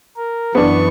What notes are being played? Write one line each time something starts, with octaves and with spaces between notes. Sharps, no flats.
A#4
F#2 E3 B3 D4 C#6